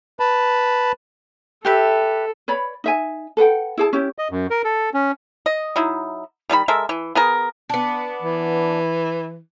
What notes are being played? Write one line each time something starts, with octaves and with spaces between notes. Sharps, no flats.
B4 A5 B5
G4 A4 B4 E5
B4 C#5 D5 B5
D#4 E5 G#5
A4 B4 F#5 G5
E4 G#4 A5
C#4 E4 G4
D#5
F#2
A#4
A4
C#4
D#5
F#3 D#4 E4
D#3 G3 G#4 B5
G#3 A4 A#4 E5
E3
B3 G#4 A#4
B3 D4
E3